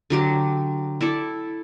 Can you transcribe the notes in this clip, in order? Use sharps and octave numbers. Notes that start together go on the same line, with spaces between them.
D3 F#3 G4
E4 A4 D5